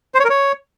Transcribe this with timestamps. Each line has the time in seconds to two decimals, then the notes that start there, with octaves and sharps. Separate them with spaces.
0.15 C5
0.20 C#5
0.25 A#4
0.30 C#5